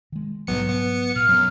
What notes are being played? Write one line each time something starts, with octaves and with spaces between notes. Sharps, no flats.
D#3 G#3
B1 G#2 F#3 G3 B3 C#7
B3 C#7
A#2 F6
F#2 F#3 B3